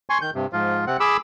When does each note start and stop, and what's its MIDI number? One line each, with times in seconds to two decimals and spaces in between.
0.10 0.18 80
0.10 0.18 84
0.10 0.18 85
0.21 0.30 51
0.21 0.30 91
0.35 0.46 43
0.35 0.46 48
0.53 0.85 44
0.53 0.85 53
0.53 0.85 65
0.87 0.97 48
0.87 0.97 60
0.87 0.97 78
1.00 1.17 68
1.00 1.17 83
1.00 1.17 86
1.00 1.17 88